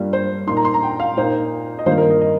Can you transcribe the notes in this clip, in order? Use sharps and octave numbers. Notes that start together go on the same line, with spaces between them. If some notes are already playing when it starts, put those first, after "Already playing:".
Already playing: G2 G3 A#3 F4
C5
A#2 A#3 D#4 C6
A#5
C6
A#5
G5
F5
A#2 A#3 D#4 C5
D#5
G2 D#3 A#3 F4 C5
A#4
D#5
D#5